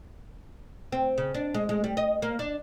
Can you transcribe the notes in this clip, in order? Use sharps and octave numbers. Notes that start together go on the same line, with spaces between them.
C4
C#3
D4
G#3
G#3
G3
D#5
A#3
D4